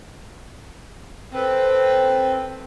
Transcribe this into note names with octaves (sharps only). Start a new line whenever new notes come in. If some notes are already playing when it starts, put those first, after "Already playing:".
C4 A4 B4